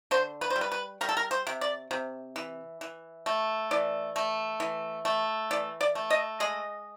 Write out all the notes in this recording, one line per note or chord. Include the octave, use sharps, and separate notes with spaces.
D3 C5
B4
C5
G3
B4
B4
G3 A#4
A4
A#4
C5
C3
D5
C3
E3
E3
A3
E3 D5
A3
E3
A3
E3 D5
D5
A3
D#5
G#3 D#5